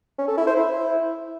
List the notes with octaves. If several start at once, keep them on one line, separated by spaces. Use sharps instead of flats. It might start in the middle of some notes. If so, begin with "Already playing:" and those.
C#4
A4
E4
C5
E4